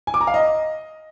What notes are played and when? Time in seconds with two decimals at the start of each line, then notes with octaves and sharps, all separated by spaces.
0.07 G#5
0.14 D6
0.21 A#5
0.27 F5
0.34 D#5